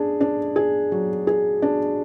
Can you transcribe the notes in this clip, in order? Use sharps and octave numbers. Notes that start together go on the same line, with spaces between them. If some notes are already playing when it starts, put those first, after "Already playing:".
Already playing: D4 G#4
D4
G#4
F#3
G#4
D4